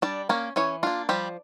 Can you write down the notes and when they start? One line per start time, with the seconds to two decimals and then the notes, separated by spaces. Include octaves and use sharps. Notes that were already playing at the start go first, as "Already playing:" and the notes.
0.02 G3 D4 D5
0.29 A#3 C#4 A#4
0.56 E3 C#4 C#5
0.83 A#3 D4 F4
1.09 F3 G3 G4